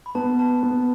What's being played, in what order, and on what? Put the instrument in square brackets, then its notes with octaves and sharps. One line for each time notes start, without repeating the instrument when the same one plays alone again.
[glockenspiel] B5
[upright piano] B3 [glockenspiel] A5
[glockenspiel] A5
[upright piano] B3